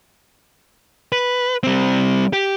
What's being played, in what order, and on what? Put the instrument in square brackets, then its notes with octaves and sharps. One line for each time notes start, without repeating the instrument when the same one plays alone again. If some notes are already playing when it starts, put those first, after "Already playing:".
[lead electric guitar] B4
G3 C4
G4